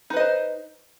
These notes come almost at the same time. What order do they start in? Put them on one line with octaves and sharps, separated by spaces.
D#4 B4 D#5 C5